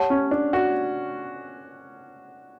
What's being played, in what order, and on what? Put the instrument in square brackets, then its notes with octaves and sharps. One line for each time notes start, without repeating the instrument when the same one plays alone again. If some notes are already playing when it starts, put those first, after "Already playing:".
Already playing: [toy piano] G4 C#5 F#5 A5
[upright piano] C#4
D4
F#4